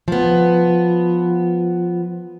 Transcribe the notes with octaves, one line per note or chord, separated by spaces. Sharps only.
F3 B3